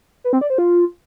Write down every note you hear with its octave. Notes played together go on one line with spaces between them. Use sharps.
B4
C4
D5
C5
F4